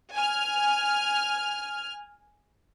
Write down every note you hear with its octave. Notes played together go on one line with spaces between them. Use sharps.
G#5 F6